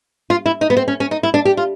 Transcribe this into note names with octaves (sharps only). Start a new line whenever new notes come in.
F4
E4
D#4
B3
C4
C#4
C#4
D#4
E4
D4
G4
F4